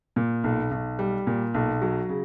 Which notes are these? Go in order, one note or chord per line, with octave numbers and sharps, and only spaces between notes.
A#2
B1
B1
G3
A#2
B1
F#3
C#3